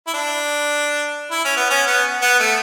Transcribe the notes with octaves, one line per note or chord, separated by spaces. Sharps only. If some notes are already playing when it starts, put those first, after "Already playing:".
E4
D4
E4
C#4
B3
C#4
B3
B3
A3